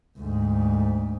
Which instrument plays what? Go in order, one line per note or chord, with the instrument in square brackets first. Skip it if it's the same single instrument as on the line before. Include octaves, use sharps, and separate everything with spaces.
[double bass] D2 G#2